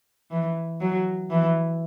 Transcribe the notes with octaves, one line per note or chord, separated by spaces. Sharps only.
E3
F#3
E3